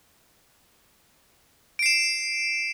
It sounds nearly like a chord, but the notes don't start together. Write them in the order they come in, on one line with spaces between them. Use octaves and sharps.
D7 C7 E7